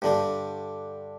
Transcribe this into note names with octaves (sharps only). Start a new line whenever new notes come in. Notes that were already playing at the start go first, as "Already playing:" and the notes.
G2 D3 G3